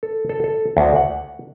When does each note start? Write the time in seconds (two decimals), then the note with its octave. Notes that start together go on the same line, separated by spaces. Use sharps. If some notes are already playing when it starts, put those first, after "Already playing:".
0.03 A4
0.29 A4
0.44 A4
0.77 D2
0.96 F#5